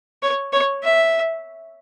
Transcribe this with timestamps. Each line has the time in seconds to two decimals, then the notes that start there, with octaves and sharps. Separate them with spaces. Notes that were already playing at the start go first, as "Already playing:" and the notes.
0.22 C#5
0.53 C#5
0.83 E5